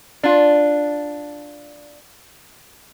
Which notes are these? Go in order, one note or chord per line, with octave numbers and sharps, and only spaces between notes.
D4 F4